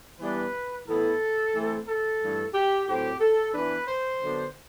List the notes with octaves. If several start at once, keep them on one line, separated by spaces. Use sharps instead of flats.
E3 G3 B3 D4 B4
A2 E3 B3 E4 A4
E3 A3 C4
A4
G2 E3 A3
G4
A2 F#3 C4 G4
A4
E3 B3 D4 B4
C5
D3 F#3 B3 D4